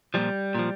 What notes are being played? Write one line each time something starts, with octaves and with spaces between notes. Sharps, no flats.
A#2 F3 G3
A#2 F3